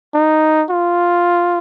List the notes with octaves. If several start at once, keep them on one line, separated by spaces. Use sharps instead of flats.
D#4
F4